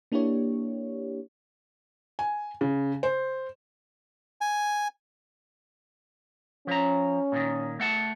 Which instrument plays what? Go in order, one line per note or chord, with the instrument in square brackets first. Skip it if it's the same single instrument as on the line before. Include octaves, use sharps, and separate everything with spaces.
[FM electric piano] A#3 D4 E4 G4 C#5
[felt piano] G#5
C#3
C5
[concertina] G#5
[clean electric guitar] F3 A#5 [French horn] C#4
[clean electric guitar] A#2 D#3
A3 F#5 A5